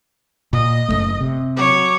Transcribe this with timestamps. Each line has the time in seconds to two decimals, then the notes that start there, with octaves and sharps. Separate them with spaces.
0.53 A#2 D#5
0.88 F#1 F2 A3
1.21 C3
1.56 F#3 C#5 D6